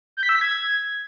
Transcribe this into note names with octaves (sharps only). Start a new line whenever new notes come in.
G6
B6
E6
B6
G#6